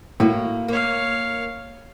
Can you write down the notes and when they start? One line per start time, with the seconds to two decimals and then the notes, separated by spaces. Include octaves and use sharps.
0.20 A2 A#3 F#4
0.68 A#3 C#5 F5